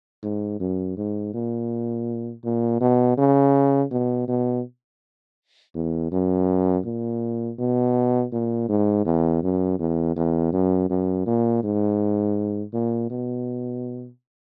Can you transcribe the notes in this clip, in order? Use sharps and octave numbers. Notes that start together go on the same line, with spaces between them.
G#2
F#2
G#2
A#2
A#2
B2
C#3
B2
B2
E2
F#2
A#2
B2
A#2
G#2
E2
F#2
E2
E2
F#2
F#2
A#2
G#2
A#2
B2